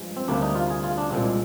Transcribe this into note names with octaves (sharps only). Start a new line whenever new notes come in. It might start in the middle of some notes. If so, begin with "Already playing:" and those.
Already playing: G2 F3 G#3
C4
D2 C3 G3 A#3 D4
D#4
F4
G#4
F4
D4
C2 A#2 G#3 C4